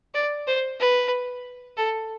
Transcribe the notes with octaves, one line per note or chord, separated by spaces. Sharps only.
D5
C5
B4
A4